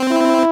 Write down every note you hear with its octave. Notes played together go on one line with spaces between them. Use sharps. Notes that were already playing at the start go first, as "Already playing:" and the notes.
Already playing: C4
E4